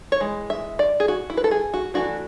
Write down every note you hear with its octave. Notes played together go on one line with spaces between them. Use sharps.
C#5
E3 G#3
E5
D5
G#4
F#4
E4
B4
A4
G#4
F#4
E3 A3 D4 F#4